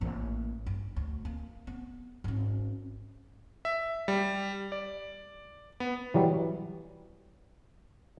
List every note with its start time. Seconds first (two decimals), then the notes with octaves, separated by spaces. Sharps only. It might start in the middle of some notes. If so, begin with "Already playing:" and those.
0.01 A1 A#3
0.66 G2
0.96 D2
1.25 A#3
1.67 B3
2.24 G#1 C#4
3.65 E5
4.08 G3
4.72 D5
5.80 B3
6.14 E3 F#3 G3